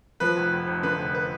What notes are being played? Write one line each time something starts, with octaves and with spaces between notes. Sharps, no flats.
F3 B4
F1
F1
F1
D3 B4
F1
B4